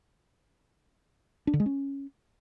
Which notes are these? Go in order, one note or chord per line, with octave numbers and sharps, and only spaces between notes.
D4
D3
G#3
C#4